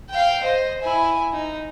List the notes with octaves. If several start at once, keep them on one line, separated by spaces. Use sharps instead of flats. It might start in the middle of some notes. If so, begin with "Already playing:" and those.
F5 G5
C5 D#5
E4 G#5
D#4